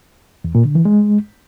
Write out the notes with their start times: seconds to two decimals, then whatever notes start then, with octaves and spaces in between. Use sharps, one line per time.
0.44 E2
0.55 A#2
0.65 D3
0.75 E3
0.85 G#3